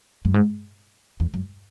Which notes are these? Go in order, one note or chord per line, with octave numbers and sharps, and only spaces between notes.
F#2
G#2
E2
F#2